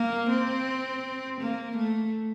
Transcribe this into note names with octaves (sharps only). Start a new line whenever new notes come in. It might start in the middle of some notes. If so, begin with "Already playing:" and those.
Already playing: A#3
C4
A#3
A3